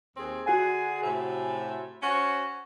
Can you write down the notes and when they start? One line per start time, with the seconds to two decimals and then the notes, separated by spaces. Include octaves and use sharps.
0.17 D#2 C4 G#4
0.46 D3 F#4 G#4 F#5 G#5
1.02 A2 C3 E5
2.02 C#4 F#4 C5